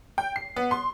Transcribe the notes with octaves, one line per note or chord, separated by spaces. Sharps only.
G5
C7
B3
C6